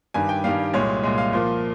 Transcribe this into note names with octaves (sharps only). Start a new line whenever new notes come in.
G2 D#3 G3 G#5
G5
G2 D#3 G3 F5
C2 A#2 G#3 C#5
C2 A#2 G#3
F5
A#2 F3 A#3